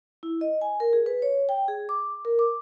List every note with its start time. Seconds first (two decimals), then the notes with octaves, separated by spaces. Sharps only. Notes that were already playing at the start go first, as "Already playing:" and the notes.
0.23 E4
0.41 D#5
0.61 G#5
0.80 A#4
0.93 G#4
1.06 B4
1.22 C#5
1.49 G5
1.68 G#4
1.89 D6
2.25 A#4
2.39 D6